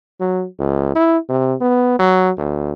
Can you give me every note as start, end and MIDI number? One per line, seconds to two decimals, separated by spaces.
0.20 0.45 54
0.59 0.92 37
0.95 1.17 64
1.29 1.54 48
1.61 1.98 59
1.99 2.30 54
2.37 2.72 38